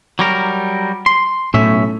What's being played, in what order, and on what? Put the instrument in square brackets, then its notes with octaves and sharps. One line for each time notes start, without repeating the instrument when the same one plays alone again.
[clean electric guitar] F#3 G3 A#4
C6
[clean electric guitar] B1 C#4 E5 [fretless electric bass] A2